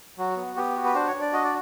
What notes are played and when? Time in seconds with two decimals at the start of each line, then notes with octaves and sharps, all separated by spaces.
0.18 F#3 F#4
0.36 B3
0.56 B3 G4
0.76 F#4
0.84 B4
0.95 D4 C5
1.07 C#5
1.14 D4
1.21 D5
1.33 F#4 D#5
1.44 D5